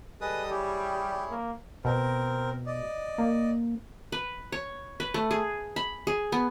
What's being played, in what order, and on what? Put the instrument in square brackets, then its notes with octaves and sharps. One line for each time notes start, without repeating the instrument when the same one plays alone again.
[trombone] G3 [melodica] G#4 B4 [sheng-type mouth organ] A4 D#5 D#6
[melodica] E4 G#4 C#5 [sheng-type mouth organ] G4
[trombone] A#3
[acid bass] B2 [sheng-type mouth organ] C4 A#4
[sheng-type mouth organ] D5 D#5
[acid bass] A#3
[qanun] B4
C#5
B4
A3
G#4
B5
G#4
B3